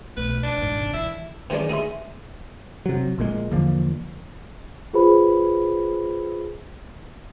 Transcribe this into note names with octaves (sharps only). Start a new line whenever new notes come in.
B1 A3 B4
F#3 D4
G#2 E3
C3
E3 E4
D#3 E3 G#3 C#4 D4
D#4 G#4 E5 C6
C3 F#3
A#1 A#2 G#3
E2 D3 F3 A#3
F4 G#4 B4 C5 B5